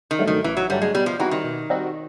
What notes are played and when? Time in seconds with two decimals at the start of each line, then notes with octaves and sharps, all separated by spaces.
0.11 D#3
0.19 G2 D3 F#3 A3
0.27 D#3
0.44 A1 E3
0.57 F#3
0.69 G2 D3 F#3 G3 A3
0.82 G#3
0.95 B2 G3
1.06 F3
1.19 E3 G3 C4 D#4 F#4
1.31 D#3
1.44 B2
1.70 G3 C4 D#4 F#4